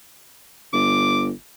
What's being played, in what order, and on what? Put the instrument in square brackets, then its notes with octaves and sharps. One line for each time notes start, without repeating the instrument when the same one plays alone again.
[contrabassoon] G1 [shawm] D6